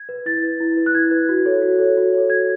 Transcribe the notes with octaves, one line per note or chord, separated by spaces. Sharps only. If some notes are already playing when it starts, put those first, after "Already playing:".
Already playing: G#6
B4
E4 A6
B4
E4
B4
F#6
E4 G#6
B4
F#4
A4 C#5
F#4
A4 C#5
F#4
A4 C#5
F#4 G#6